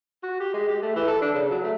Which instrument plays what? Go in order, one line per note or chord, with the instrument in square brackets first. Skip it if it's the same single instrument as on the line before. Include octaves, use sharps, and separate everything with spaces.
[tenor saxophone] F#4
G4
G#3
G4
A3
E3
A4
D4
C#3
F#3
A3